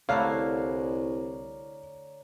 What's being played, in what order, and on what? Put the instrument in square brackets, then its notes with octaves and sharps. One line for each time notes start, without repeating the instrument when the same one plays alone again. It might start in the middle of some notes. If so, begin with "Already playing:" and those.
[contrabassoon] C2 [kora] D3 A3 E4 [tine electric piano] C#5 D5 A#5 [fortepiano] F5